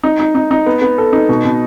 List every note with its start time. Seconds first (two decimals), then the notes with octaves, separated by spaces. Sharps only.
0.03 D#4
0.20 D#4
0.35 D#4
0.51 D#4
0.66 B3
0.82 B3
0.98 A4
1.13 D#4
1.29 B2
1.45 B2